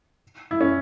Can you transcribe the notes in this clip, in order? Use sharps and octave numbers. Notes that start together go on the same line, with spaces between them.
E4
C#4